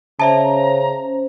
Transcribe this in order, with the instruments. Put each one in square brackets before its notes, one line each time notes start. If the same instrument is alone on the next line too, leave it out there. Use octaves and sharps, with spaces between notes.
[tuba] C#3 [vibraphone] C#4 C5 [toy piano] D5 E5 A5 [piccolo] A#5